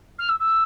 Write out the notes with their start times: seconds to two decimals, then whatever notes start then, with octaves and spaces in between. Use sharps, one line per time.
0.19 F6
0.29 E6
0.39 E6